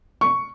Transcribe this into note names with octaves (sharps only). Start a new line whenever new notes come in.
C#6